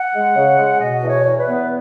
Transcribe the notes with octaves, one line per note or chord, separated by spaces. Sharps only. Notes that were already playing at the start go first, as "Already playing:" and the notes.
Already playing: F#5
G#3
C#3
G#3
B2 D#5
E2
C#5
E2
B4
B3